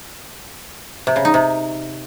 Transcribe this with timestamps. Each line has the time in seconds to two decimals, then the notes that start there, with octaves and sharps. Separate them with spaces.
1.07 C3
1.16 C#3
1.25 D#4
1.34 C3